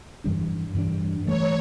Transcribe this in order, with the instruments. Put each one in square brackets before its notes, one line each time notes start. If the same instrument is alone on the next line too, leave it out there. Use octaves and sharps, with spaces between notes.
[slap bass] G2 E3 G3 D4
G2 E3 G3 D4
[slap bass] G2 E3 A3 [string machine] C#5